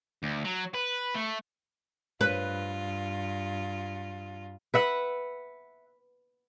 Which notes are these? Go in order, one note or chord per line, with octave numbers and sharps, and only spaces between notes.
D2
F#3
B4
A3
G2 F4 B4
B4 E5 F#5